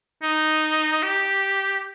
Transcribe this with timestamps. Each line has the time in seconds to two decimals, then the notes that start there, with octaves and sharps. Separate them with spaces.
0.22 D#4
1.02 G4